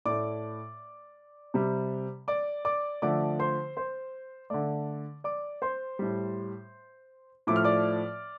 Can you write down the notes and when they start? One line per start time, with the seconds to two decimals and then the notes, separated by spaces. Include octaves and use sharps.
0.05 A2 A3 D5 D6
1.54 C3 G3
2.28 D5 D6
2.65 D5 D6
3.02 D3 F3 A3 D5 D6
3.39 C5 C6
3.77 C5 C6
4.50 D3 A3 D5 D6
5.24 D5 D6
5.62 C5 C6
5.99 A2 G3
7.47 A2 F3 A3 D6
7.56 F6
7.64 D5 D6